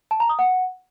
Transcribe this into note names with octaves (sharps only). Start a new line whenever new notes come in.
A5
A#5
D#6
F#5